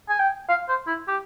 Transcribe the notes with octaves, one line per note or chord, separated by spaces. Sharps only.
G#5
G5
F5
C5
E4
G4